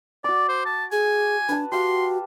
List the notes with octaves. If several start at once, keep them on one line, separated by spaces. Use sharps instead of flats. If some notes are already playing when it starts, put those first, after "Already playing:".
F#4 D5 D6
C5
A5
G#4 G#5
D4 B4 A5
F#4 G4 F5 C6